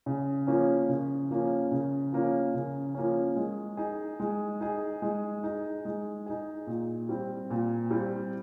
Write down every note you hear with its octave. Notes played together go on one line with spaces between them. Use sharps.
C#3
F3 A#3 C#4
C#3
F3 A#3 C#4
C#3
F3 A#3 C#4
C#3
F3 A#3 C#4
G#3
D#4 G#4
G#3
D#4 G#4
G#3
D#4 G#4
G#3
D#4 G#4
A#2
G3 C4
A#2
G3 C4